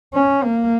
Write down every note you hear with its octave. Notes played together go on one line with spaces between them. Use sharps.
C#4
A#3